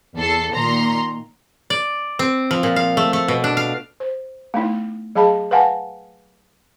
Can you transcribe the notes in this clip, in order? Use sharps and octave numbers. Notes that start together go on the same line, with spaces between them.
E2 A4 C7
A#2 D#3 A#5 C6
D5
C4
F3
A#2
F5
A3
A3
B2
D4
F5
C5
A3 B3 D#4 E4
F#3 G#4 F5 A5 B5
B4 F5 F#5 G#5 A5